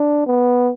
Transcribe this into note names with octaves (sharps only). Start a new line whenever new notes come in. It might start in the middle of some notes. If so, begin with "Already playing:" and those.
Already playing: D4
B3